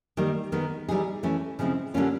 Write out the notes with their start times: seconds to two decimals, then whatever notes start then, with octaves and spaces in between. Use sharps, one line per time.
0.17 D#3 G3 A#3
0.52 D#3 G#3 B3
0.88 E3 G3 B3 D#4 G#4
1.23 E3 A3 C#4
1.59 C#3 F3 G#3 C4 E4
1.94 D3 G3 A#3 C#4 F4